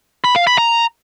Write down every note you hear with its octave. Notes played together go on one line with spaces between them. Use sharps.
B5
F5
B5
A#5